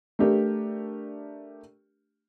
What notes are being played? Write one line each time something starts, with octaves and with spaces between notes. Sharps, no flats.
A3 D4 G4 A#4